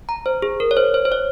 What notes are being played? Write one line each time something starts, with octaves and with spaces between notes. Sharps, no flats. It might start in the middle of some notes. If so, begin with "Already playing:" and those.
A#5
C5
G#4
A#4
C#5
C5
C5
C5
C#5